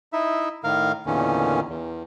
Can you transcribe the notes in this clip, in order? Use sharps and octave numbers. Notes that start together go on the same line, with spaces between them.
D#4 E4 E5
A2 D#3 A#4 F5
E2 A#2 D3 D#3 C#4
E2